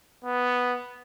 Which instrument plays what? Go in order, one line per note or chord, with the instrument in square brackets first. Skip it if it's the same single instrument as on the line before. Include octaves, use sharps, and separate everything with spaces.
[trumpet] B3